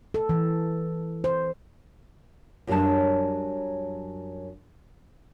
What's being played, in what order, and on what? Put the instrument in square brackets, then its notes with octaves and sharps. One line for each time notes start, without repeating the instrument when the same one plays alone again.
[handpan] A4
E3
C5
[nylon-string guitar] F#2 F#3 G3 C#4 D4 A5